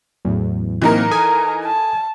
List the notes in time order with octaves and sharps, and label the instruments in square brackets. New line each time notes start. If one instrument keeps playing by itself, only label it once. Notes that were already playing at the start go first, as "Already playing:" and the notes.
[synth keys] E2 [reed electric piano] A2 F#3
[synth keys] C3 A#3 [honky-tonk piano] E3 D#4 A#4
[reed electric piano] A4 D#6 [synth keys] G#5 [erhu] A#5
[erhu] A5